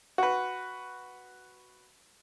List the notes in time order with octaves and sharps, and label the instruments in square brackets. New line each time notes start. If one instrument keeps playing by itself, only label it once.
[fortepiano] F#4 B4